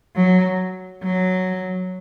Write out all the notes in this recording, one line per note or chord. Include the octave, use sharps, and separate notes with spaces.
F#3
F#3